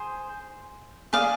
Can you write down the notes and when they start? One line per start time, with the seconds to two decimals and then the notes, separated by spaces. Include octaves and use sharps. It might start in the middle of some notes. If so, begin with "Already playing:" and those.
Already playing: G#4 C5
1.13 G#4 D5 F5